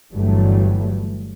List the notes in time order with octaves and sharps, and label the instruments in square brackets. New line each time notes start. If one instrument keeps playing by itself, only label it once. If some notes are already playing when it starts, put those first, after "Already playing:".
[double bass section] G1 G2 E3 F#3 G3 A3